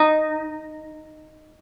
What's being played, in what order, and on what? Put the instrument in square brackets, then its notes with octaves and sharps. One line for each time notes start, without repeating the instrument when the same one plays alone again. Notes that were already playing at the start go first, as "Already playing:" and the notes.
Already playing: [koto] D#4